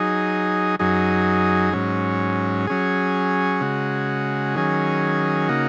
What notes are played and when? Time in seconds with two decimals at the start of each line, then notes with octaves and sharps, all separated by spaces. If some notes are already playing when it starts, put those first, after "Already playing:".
Already playing: F#3 D#4 G#4
0.79 F#2 F#3 D#4 G#4
1.73 G#2 F#3 C#4
2.67 F#3 C#4 G#4
3.61 C#3 G#3 F#4
4.55 D#3 F#3 C#4 G#4
5.49 C#3 A#3 D#4 F#4